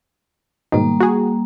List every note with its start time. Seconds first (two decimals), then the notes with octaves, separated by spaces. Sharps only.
0.72 G#2 B2 D#3 G3 A#3
1.00 F#4 G#4